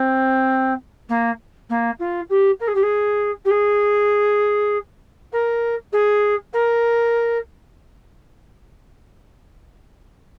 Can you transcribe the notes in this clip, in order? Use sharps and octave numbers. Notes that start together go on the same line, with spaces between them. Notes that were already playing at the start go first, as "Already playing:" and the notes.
Already playing: C4
A#3
A#3
F4
G4
A#4
G#4
G4
G#4
G4
G#4
A#4
G#4
A#4